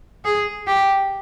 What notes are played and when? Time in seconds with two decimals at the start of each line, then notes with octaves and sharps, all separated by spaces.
0.25 G#4
0.67 G4